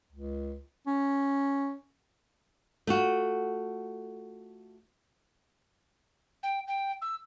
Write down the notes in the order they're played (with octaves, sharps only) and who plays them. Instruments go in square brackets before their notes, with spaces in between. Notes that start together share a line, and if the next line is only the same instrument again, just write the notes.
[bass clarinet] C#2
C#4
[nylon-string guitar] A3 F4 F#4
[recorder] G5
G5
E6